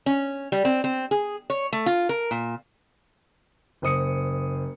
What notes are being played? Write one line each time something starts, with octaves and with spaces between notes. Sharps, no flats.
C#4
G3
C4
C4
G#4
C#5
A3
F4
A#4
A#2
F#1 C5 D#6 C#7